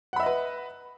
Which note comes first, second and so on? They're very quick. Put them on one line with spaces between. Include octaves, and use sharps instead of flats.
F#5 B5 E5 D#5 B4